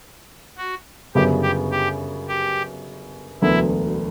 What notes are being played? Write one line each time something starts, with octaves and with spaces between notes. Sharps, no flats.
F#4
G1 F#2 C#3 G3 B3 G4
G4
G4
G4
E1 D2 D3 F#3 B3 E4